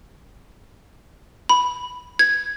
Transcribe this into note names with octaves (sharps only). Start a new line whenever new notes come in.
B5
G#6